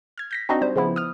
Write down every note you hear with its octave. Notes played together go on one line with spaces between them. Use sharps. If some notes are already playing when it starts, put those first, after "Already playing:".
F6 G#6
G6 A#6 B6
C4 D4 D#4 F#4 D#5
G3 C5
C#3 F3 B3 E4
D#6 F6